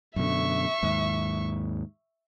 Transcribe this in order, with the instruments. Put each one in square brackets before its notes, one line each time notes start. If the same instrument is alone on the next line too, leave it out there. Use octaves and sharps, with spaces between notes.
[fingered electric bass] F#2 B2 D3 [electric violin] E5 C#6
[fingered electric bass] D#2 G#2